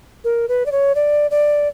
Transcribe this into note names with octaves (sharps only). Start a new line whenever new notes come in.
A#4
B4
D5
C#5
D5
D5